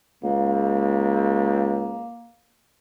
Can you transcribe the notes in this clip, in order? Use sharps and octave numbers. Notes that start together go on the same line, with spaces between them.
C#2 A#3